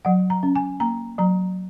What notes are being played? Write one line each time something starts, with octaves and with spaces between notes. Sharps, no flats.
F#3 F#5
A#5
C#4
G#5
A#3 A#5
F#3 A#5